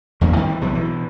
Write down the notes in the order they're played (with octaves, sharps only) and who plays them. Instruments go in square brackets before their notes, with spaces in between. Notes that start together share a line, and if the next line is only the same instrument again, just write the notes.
[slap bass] E2 G2 F#3 A#3
D#3 G3 C4
E3
B1 C3 E3 F#3
B2 E3